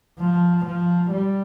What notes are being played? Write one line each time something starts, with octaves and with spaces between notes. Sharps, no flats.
F3
F3
G3